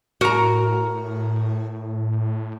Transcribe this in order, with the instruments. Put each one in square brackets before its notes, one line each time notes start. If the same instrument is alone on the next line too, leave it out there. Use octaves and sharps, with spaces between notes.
[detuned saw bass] A2 [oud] F#4 [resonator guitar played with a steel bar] A#4 A#5